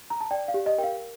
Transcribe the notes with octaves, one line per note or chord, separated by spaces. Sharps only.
A#5
A5
D5 G5
F5
G4
D#5
A#4 G5
F5